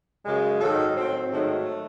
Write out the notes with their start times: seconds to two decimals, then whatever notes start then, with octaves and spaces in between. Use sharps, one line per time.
0.24 F#2 C#3 G#3
0.60 G#2 D#3 F#3 A4
0.96 A2 F#3 C4
1.30 G#2 D#3 F#3 A3